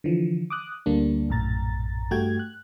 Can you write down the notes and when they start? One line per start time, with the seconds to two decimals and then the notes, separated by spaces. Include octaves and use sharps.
0.04 D3 E3 F3
0.50 D6 D#6 F#6
0.86 D2 D3 G3 A#3 D4
1.29 A#1 F#2 A2 A#5 A6
2.11 G2 A3 F#4 G4 G5 G#6
2.39 F#6